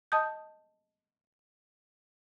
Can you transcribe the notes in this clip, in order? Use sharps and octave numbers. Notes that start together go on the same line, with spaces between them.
D#5 A5 D#6 G6